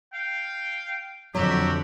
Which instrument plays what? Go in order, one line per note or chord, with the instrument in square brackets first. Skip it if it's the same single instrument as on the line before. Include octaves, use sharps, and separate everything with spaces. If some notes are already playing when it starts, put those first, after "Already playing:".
[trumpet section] F5 G5
[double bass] F2 D3 [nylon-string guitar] F#3 [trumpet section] F#4 G4 E5